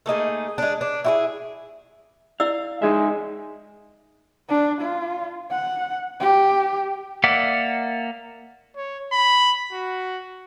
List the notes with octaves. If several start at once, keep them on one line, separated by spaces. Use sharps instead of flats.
A3 A#3 D#4 G#4
G#3 D4
D4
E4 F#4 G#4
E4 D5 F5 E6
G#3 D#4 G#4 E5
D4
F4
F#5
G4
A#3 D5 E5 F#5 D6
C#5
B5
F#4